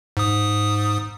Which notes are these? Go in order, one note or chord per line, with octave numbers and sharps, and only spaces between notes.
G#2 D#6